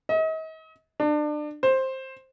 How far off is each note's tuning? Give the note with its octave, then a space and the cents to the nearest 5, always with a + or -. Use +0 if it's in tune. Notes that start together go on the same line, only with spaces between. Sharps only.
D#5 +40
D4 +30
C5 +10